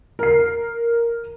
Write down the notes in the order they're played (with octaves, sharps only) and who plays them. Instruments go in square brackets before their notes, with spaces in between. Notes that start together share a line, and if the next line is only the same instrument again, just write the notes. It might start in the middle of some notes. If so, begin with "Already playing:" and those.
[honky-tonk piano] A#4 C7